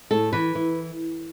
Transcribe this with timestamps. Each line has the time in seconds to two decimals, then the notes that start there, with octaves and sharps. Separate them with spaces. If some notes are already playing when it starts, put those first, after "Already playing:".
0.11 A2 A4
0.33 E3 B4
0.55 E3